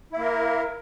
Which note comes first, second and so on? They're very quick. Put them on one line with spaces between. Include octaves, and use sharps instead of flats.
E4 A#3 A#4